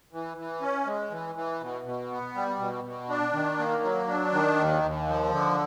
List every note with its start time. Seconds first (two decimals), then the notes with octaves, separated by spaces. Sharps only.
0.13 E3
0.37 E3
0.61 C#4
0.86 G#3
1.10 E3
1.35 E3
1.60 B2
1.85 B2
2.11 B3
2.35 G3
2.59 B2
2.84 B2
3.10 D4
3.33 D#3
3.59 A#3
3.83 F#3
4.08 D4
4.32 D#3
4.58 D#2
4.83 D#2
5.07 F3
5.31 D3